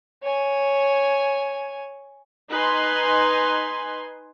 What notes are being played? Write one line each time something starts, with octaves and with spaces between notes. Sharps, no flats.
C#5 G#5
D#4 B4 G#5 C6